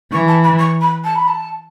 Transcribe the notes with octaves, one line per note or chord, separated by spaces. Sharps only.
E3 C#6
A5
B5
C#6
B5
A5
B5
A5